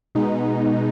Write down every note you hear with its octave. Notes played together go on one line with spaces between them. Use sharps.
B2 G#3 B3 D#4